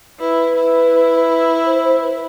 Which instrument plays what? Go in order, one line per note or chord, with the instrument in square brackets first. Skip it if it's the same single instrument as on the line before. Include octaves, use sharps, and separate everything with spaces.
[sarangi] E4 [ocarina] B4
[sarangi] E4
[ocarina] C5
C5
B4